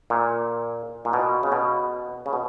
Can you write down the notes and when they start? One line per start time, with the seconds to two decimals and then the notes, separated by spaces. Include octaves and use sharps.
0.10 A#2
1.05 A#2
1.13 B2
1.43 C#3
1.52 B2
2.26 C#3
2.33 B2